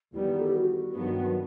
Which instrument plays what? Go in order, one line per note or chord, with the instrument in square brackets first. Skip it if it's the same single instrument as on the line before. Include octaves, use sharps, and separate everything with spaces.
[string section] E2 D#3 G3 B3 [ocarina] E4
[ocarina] A4
G4
F#4
[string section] G2 D#3 F#3 B3